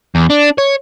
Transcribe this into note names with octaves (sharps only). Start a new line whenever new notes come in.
E2
D4
C#5